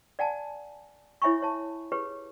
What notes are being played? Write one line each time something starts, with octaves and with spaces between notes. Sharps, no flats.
D5 F#5 G#5 A5
E4 C#5 E5 G#5 B5 C#6
C#5 A5
G4 G#4 B4 C#5